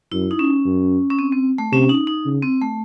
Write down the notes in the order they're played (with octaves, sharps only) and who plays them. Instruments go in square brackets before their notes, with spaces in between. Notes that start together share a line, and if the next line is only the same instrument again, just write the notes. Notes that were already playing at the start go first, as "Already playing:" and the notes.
[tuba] F#2 [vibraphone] E4
[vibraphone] D#4
C#4
[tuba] F#2
[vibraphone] C#4
C4
C4
A3
[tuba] C3 [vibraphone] C#4
[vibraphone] D#4
D#4
[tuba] C#3
[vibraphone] C4
A3